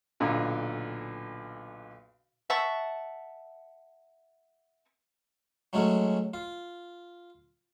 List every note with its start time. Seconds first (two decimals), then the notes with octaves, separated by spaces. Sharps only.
0.20 B1 A#2 D3
2.50 E5 F#5 A5 C#6
5.73 F#3 G#3 A3 C#4 F#4
6.34 F4